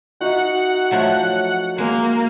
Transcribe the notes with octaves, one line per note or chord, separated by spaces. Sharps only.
D#4 F#4 E5 F#5
F3 F#3 A3
G#3 A#3